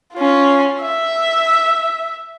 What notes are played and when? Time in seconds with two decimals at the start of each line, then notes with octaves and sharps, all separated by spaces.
0.14 C#4 F4
0.82 E5